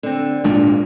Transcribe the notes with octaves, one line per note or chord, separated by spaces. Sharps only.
D3 C4
G#1 A#2 G#3 D4